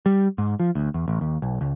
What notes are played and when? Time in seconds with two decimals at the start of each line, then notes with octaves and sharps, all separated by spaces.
0.06 G3
0.38 G#2
0.60 F3
0.75 D2
0.94 E2
1.08 A1
1.21 D#2
1.42 B1
1.61 C#2